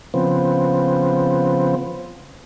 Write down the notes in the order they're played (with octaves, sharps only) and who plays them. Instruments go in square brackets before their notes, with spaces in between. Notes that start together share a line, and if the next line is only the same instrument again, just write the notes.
[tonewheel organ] C#3 F3 B3 C4